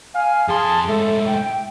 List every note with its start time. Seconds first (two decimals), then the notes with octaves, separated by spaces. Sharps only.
0.15 F5 G#5
0.48 F2 G#4 A5 C6
0.88 A2 G#3 A4 E5
1.26 G5